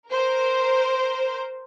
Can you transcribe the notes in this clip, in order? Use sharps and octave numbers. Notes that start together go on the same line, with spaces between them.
A#4 C5